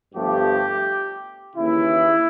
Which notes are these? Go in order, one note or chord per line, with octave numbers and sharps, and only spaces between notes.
G1 G2 D3 F3 A3 G4
D#2 C#3 E3 E4